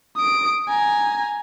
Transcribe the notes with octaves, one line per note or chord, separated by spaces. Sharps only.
D#6 D7
G#5 A#5